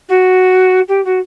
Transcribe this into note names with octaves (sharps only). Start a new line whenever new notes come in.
F#4
G4
F#4